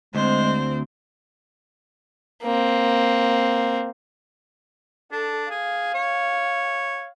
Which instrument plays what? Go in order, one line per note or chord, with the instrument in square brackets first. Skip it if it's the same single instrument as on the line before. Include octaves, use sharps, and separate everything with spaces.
[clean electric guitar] D2 [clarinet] G#3 [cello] C4 [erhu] C5
[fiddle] A#3 C4
[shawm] D4 [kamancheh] A4
[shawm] G#4 [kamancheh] F5
[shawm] C#5